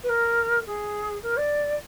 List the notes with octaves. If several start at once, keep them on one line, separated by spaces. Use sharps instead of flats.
B4
A#4
G#4
A#4
D5